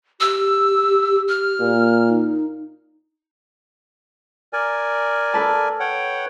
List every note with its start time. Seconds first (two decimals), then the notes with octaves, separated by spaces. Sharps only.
0.20 G4 E6
1.29 F6
1.60 A#2
2.08 D#4
4.53 A#4 D5 G#5
5.34 A4 B4 A5
5.80 C#5 F#5 G5